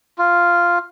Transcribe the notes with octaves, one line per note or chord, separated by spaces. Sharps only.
F4